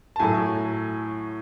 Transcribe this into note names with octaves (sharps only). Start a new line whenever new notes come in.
A5
A2 F#3 A3 G#5